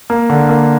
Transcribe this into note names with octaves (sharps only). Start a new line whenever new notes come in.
A#3
D3
A#3